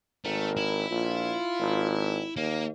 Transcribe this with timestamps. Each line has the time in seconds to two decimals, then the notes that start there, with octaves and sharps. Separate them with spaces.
0.25 G#1 A3 A#4
0.57 E4
0.90 A#1 F4
1.60 G#1
2.36 D#2 A#3